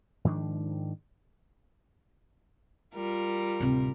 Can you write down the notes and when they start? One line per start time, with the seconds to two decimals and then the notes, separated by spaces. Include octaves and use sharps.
0.25 G#2 D#3 F3 D4
2.94 G3 F4 A#4
3.60 D1 C3